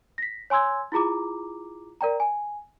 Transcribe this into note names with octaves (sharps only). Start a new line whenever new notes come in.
A#6 B6
C#5 G#5 C6 E6 G#6
E4 F4 G#4 A#5 D6
A#4 D5 G5 A#5
G#5